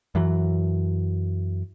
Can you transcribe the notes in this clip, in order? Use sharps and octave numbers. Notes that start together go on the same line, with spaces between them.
F#2 E3 F#3